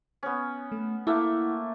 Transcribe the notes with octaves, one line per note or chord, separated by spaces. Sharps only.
B3 C#4
A3
A3 A#3 E4 F#5